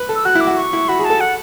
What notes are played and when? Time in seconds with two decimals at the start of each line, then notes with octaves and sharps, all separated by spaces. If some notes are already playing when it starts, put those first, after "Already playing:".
Already playing: B4
0.09 A4
0.15 E6
0.25 F#4 F#6
0.35 E4
0.41 D6
0.47 F#4
0.57 C#6
0.73 E4
0.89 F#4 B5
0.99 G#4
1.05 A5
1.10 A4
1.21 F#5